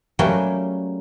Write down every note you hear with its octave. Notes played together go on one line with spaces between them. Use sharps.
F#3 G3 A3 A#3 C#4 G4